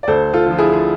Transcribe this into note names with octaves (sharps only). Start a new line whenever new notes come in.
D5
D2 A4 C5
F4 A4
D3 F3
E4 G#4
G#4